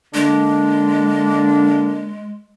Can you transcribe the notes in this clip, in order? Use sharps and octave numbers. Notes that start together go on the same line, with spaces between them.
D3 G#3 A#3 D4